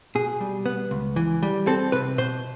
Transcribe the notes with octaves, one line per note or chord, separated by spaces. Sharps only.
B2 G#4
G3
B3
C#2
E3
G3
C4 A4
C3 B4
B2 C5